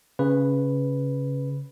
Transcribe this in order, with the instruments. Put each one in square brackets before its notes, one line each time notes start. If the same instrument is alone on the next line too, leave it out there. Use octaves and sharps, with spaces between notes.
[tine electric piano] C#3 B4